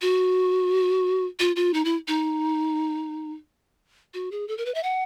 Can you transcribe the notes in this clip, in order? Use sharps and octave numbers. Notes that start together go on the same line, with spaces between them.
F#4
F4
F4
D#4
E4
D#4
F#4
G#4
A4
A#4
B4
E5
F#5